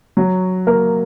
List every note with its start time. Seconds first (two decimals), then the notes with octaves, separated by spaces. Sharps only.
0.17 F#3 F#4
0.67 A#3 A#4